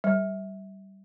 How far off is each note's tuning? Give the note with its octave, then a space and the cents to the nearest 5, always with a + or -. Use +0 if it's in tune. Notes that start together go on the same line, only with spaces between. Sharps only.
G3 -20